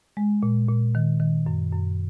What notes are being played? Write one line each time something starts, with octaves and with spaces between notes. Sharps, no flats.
G#3
A#2
A#2
D#3
D#3
F#2
F#2